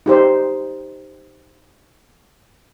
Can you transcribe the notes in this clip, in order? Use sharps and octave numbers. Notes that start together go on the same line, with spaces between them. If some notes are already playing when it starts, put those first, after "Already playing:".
D#4 G4 C5